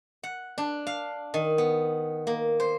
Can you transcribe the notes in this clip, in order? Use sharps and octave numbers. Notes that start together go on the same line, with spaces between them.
F#5
D4
F5
D#3
B3
A#3
C5